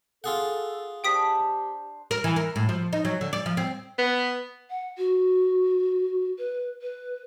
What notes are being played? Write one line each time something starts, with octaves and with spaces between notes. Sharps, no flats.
F4 G#4 A4 F#5
D4 G4 C5 G5 D#6 B6
A#4
E3
A#4
A2
F3
D#4
F#3
D3
D5
F3
C4
B3
F#5
F#4
B4
B4